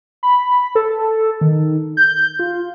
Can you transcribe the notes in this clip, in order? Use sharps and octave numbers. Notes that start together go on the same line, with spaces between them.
B5
A4
D#3
G6
F4